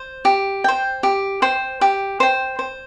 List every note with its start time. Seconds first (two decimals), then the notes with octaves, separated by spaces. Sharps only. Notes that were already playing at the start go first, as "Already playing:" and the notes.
Already playing: C5
0.25 G4
0.64 C5 G5
1.03 G4
1.42 C5 G5
1.81 G4
2.20 C5 G5
2.59 C5